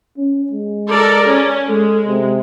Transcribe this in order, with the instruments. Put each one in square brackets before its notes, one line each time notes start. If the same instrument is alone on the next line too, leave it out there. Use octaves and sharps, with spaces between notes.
[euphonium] C#4
G#3
[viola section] A4 A#4 D5
C#4
[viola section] G#3 [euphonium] A4
[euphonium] C3